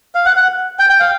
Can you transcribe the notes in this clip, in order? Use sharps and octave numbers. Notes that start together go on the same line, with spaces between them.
F5
F#5
F#5
G5
G5
F5